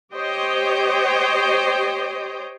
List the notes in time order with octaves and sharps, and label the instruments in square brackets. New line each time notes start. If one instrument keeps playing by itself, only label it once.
[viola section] G4 C5 C#5 D#5 G5